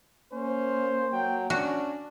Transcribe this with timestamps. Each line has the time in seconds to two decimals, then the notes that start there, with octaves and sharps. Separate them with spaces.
0.32 A#3 C#4 C5
1.12 F#3 G5
1.50 C#4 D4 F#4